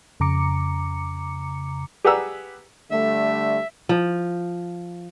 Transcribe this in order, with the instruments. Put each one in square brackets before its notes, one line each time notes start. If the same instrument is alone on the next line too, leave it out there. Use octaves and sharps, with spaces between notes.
[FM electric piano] F2 C#3 A#5 D6 C#7
[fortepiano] G4 G#4 B4 F#5 A#5 E6
[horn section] D3 G3 A3 [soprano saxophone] E5
[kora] F3